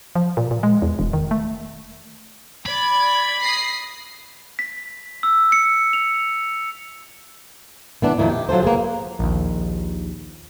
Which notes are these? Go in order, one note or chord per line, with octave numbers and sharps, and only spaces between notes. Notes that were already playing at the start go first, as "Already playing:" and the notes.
F3
A#2
A#2
G#3
E2
E1
D#3
A3
D5 B5 G#6
D#6 A#6 C7
B6
E6
C#7
F7
E3 B3 D4
F2 A#2 D#3 E4
G4
F#3 F4 A4 C5
A#3 B3 G#4
A#1 D#2